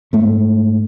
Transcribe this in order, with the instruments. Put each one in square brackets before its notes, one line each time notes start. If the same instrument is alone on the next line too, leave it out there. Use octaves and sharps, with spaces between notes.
[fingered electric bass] G#2 A3